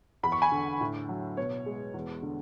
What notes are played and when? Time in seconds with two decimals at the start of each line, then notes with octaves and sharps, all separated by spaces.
0.23 E2 B5
0.32 C#6
0.42 G#5 B5
0.52 D3
0.81 A2
1.09 F#3
1.37 B2 C#5
1.66 G#3
1.94 E2
2.23 D3